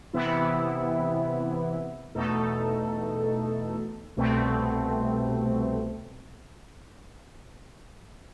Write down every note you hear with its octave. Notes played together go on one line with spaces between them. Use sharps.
C3 E3 B3 E4
E2 B2 A3 D#4 A4
C2 B2 A3 C4